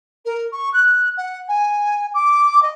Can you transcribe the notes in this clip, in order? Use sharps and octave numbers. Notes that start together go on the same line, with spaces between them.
A#4
C#6
F#6
F#5
G#5
D6
D#5